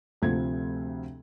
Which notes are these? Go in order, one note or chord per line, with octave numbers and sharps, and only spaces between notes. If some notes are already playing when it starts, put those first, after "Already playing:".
D2 C3 F3 G#6